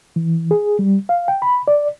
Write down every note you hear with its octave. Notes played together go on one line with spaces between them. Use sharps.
E3
G#4
G3
F5
G5
B5
D5